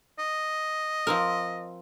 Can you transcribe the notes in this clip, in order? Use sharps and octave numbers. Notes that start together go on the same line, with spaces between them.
D#5
F3 C4 A#4